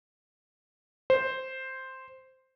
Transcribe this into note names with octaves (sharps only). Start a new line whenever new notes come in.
C5